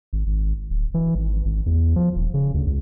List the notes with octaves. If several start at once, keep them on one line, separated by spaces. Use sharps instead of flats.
G#1
G#1
D1
E3
G#1
G#1
E2
F3
D#1
C#3
D2
C#2